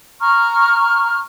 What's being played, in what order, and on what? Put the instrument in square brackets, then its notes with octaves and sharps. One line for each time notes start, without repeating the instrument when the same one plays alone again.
[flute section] A#5 C#6 F6